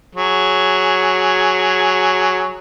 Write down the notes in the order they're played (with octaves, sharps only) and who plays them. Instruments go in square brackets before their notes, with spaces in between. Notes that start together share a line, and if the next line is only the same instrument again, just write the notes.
[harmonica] F#3 G#4